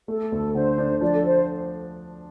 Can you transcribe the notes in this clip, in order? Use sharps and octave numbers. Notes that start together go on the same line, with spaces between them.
A3 A4
D2
D3 C5
D4
F3 D5
A4
C5